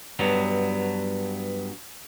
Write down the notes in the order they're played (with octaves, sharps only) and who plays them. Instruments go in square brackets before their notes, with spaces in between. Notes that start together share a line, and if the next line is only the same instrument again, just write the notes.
[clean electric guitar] G2 F#3 B3